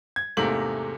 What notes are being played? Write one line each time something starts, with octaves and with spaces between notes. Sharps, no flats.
G#6
E2 G#2 C3 A3 A#3 F#7